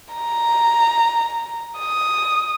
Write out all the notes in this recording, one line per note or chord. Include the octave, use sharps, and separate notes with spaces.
A#5
D#6